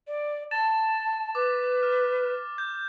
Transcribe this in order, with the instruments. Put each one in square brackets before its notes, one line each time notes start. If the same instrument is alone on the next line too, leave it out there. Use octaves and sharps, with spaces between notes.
[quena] D5
[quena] A5 [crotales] A6 E7
[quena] B4 [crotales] D6
[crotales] F6
G6